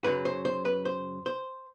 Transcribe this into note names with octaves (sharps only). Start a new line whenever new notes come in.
F#2 C#3 F#3 B4
C5
C5
B4
C5
C5